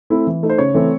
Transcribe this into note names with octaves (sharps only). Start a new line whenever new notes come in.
A3 C4 E4
E3
A3 D#4
C5
C#3 C#5
E3 A3 C4